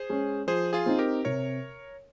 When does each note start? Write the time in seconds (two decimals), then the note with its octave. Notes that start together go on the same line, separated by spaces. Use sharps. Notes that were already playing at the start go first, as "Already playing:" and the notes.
Already playing: G#4 C5
0.09 G#3 C#4
0.47 F3 G#4 C5
0.73 F4 G#4
0.86 C4 D#4
0.99 G4 A#4
1.25 C3 A#4 C#5